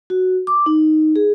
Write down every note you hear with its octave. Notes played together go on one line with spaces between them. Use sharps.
F#4
D6
D#4
G#4